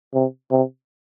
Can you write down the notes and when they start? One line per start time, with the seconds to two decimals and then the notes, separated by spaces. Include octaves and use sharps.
0.14 C3
0.51 C3